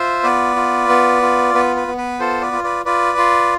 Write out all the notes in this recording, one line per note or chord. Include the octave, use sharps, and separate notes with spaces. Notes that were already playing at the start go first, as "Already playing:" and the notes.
Already playing: F4 C5 E5
B3 B4 D5
F4
B3
F4
B3 B4
B4
B3
B4
F4 A4 C5
B4 D5
F4
B4 D5
F4 B4 D5
F4